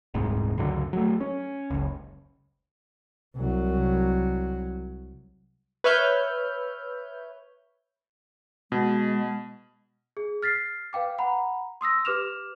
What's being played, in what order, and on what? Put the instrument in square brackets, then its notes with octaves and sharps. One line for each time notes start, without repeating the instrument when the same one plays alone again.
[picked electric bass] D#1 C2 G#2
C#2 F#2 D3
F#3 A3
C#4
F#1 C#2
[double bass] C2 F#3
[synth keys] B4 C#5 E5 F6 G6
[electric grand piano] B2 [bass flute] G#3
[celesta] G#4
F6 A6 B6 C7
B4 F5 G5 D6
F#5 A#5 B5
C6 D#6 E6 A#6
G4 B4 D6 F6 E7 F7